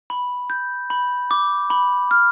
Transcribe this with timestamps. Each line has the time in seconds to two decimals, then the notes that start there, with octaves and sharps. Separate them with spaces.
0.10 B5
0.50 G6
0.90 B5
1.31 D6
1.70 B5
2.11 F6